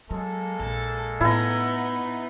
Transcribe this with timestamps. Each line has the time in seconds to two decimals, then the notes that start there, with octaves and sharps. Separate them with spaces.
0.11 F#3 G#3 A#3 A4
0.60 A#1 A5
1.21 A2 B3 D#4 E4 A#5